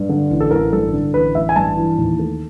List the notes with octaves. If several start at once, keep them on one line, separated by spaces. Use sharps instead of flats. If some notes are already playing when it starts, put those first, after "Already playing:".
Already playing: G2
D3
A1
A4
A1 A#4
G2 A4
D3
A1 B4
A1 E5
G#5
G2 A5
E3
D#2
A3